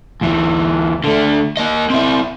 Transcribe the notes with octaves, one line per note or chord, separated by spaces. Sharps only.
D2 E3
D3 A3
A#3 D#5
C4 E4